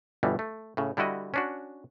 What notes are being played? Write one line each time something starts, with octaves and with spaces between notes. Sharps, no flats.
G1 B2 E3 G3
A3
A2 C#3
D3 G3 E4 F#4 D#5
C#4 D4 F#4